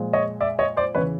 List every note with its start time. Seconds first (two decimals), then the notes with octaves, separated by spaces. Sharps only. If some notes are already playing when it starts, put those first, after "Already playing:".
Already playing: A#2 F3 G#3
0.13 C#5 D#5
0.40 D5 E5
0.59 C#5 D#5
0.77 C5 D5
0.95 E2 C#3 E3 B4 C#5